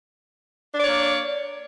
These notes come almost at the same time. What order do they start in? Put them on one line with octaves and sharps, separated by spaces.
D4 D5 C#5 A#3